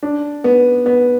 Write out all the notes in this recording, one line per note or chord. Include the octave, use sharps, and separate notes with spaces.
D4
B3
B3